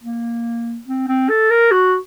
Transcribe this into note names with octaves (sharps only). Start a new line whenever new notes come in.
A#3
C4
C4
A4
A#4
F#4